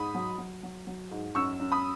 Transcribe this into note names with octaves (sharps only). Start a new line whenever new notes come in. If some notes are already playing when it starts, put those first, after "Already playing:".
Already playing: G#2 B5 D#6
F#3
F#3
F#3
F#3
G#2
F#2 C#6 E6
F#2
B5 D#6